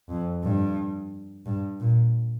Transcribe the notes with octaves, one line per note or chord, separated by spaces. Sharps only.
F2
G2
G2
A#2